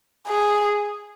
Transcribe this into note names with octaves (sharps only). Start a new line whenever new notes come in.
G#4